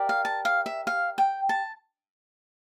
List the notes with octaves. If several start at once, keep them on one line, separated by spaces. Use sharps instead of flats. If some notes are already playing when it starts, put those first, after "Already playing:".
Already playing: G4 A#4 D5
F5
A5
F5
E5
F5
G5
A5